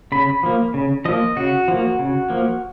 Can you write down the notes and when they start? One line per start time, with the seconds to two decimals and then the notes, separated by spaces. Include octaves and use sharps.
0.12 C#3 B5
0.43 F3 A#3
0.74 C#3
1.05 F3 A#3 D#5
1.37 C#3 F#4
1.68 F3 A#3
1.99 C#3
2.30 F3 A#3